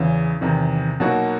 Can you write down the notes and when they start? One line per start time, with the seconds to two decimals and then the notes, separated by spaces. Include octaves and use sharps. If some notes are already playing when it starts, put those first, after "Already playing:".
Already playing: E2 C#3 E3
0.41 E2 C3 D#3
1.00 B2 F#3 A#3 D#4 F#4